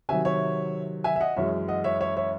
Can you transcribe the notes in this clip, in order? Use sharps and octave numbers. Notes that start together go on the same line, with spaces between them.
C3 D#3 F#3 E5 G#5
C#5 E5
E5 G#5
E5
D#5 F#5
F#2 E3 G#3 C#5 E5
D#5 F#5
C#5 E5
C#5 E5
C#5 E5